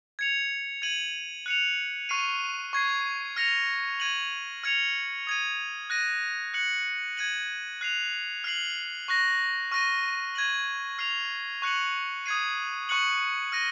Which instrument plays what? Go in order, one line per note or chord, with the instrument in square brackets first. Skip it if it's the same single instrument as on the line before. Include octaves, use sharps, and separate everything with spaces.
[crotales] G#6 C#7 F7
G#6 D#7 F#7
F#6 C#7 F7
C#6 F6 C7 D#7
C#6 G#6 C7
F6 A#6 C#7 F7
G#6 D#7 F#7
F6 G#6 C#7 F7
D#6 G#6 D#7
F#6 A#6 D#7
F#6 C#7 F#7
G#6 D#7 F#7
F#6 C7 F7
F6 C7 F#7
C#6 F#6 A#6
C#6 F6 A#6 D#7
G#6 D#7 F#7
F6 C7 F7
C#6 F#6 C#7 F#7
D#6 G#6 C7 D#7
C#6 F#6 C#7 F#7
F6 A#6 D#7